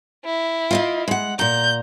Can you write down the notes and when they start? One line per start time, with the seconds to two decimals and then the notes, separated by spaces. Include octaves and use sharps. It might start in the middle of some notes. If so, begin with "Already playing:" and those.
0.25 E4
0.71 F4 D#5 F5
1.08 G#3 F#5
1.39 A#2 A#5 G6